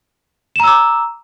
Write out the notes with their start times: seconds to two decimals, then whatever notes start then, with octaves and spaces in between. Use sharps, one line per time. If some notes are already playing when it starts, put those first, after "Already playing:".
0.56 E7
0.60 A#5
0.64 E6
0.68 D6